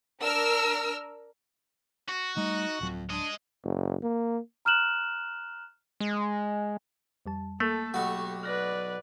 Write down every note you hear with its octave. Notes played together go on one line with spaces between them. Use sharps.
D4 A#4 E6 F6
F#4
G3 A3 D#4
D1 F2 F#3
G#3 D4 D#5
F#1
A#3
A#5 F6 F#6 E7 F#7
G#3
F2 G3 A5
A3 A#3 A4
B1 F#4 G4 C#6
B4 D5 F6 F#6 A#6